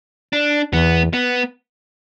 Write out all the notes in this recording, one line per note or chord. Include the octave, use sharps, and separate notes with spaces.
D4
E2 B3
B3